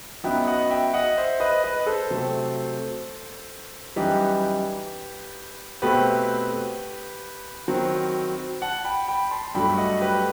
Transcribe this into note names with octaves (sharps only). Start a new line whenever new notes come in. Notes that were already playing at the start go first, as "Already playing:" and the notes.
F#2 F#3 B3 D#4 E5 G5
D#5 F#5
E5 G5
D#5 F#5
C5 E5
B4 D#5
B4 D#5
B4
A4 C5
C3 F#3 A3 C4
F#2 E3 G3 D#4 G4 B4
B2 A3 C4 G4 B4
D#3 F#3 C4
F#5 A5
G5 B5
G5 B5
A5 C6
G2 F#3 A3 G5 B5
D#5 F#5
G4 B4